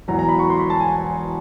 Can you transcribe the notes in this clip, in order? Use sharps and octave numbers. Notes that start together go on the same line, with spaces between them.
E1 E2 B2 F#3 A#5
A#5
B5
C#6
C6
B5
A5
G#5